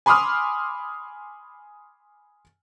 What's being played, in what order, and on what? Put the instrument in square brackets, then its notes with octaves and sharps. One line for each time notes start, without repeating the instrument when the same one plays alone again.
[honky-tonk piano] G#5 B5 C6 D6 D#6 F6